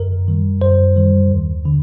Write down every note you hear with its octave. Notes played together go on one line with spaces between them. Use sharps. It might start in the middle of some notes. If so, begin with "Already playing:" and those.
Already playing: F#2 A#4
D#3 G3
F#2 C5
D#3 G3
D#2
D3